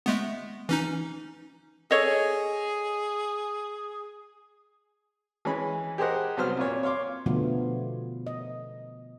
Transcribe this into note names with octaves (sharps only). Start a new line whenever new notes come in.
G#3 A3 B3
E3 C#4 D#4
G#4 A4 C#5 D#5
E3 G#3 C#4 B5
G4 G#4 A#4 C5 D#5 F#5
C2 F#3 B3 C5 F6
F2 A#2 C#5
C#5 F5 C6 D6
B2 D3 F3 A3 B3 F4
D#5